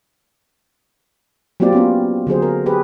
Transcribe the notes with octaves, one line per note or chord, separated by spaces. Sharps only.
F#3 A#3 C4 F4 G4 D5
B3 C#4 F4
D3 F#3 G#4 C5
A#4
G4 G#4 B4